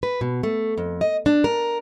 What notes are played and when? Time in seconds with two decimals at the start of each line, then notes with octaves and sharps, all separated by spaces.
0.03 B4
0.21 B2
0.43 A3
0.77 F2
1.01 D#5
1.26 D4
1.44 A#4